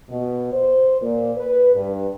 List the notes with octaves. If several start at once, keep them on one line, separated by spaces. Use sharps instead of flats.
B2
C5
A#2
B4
G2